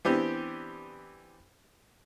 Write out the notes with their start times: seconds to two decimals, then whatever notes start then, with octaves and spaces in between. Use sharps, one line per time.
0.05 E3 B3 C4 D4 G4